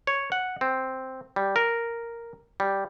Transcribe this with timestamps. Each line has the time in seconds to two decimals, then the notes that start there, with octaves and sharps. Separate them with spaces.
0.07 C#5
0.32 F#5
0.61 C4
1.36 G3
1.56 A#4
2.60 G3